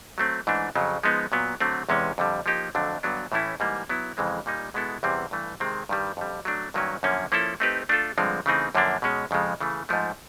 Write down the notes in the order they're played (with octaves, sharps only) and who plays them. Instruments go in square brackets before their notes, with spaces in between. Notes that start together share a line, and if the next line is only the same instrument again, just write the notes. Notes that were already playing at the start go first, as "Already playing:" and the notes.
[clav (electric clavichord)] F#3 A3 C4
G#2 E3 A3 D4
F2 C#3 F#3
F3 G#3 B3 D#4
A#2 F#3 B3
D3 F#3 A3 C4
E2 C3 E3 G#3 C#4
F2 D3 G3
F3 A#3 D#4 G4
F2 D3 F#3 A3 D4
G2 D3 F#3 B3 D4
A2 E3 A3 C#4 E4
G#2 E3 G3 A#3
F#3 B3 E4
F2 C#3 E3 G#3 C4
A#2 G3 A#3 D#4
B2 G#3 B3 E4 A4
E2 C3 E3 G3 C4
G2 E3 A3
C3 D#3 G#3 C4
G2 D#3 G3
F2 D3 G3
F#3 A3 D4
G2 D#3 F#3 A#3 C#4
F#2 D3 F3 A#3 C#4
F3 A#3 C#4 E4 A4
A3 C4 D#4 G4 B4
A3 D4 F4 A4
G2 D3 F3 G#3 C4
C#3 E3 A3 C4 D#4
F#2 D3 F3 A#3 D4
B2 G#3 C#4
F2 C#3 F3 G#3
C#3 E3 A3
G#2 F3 A3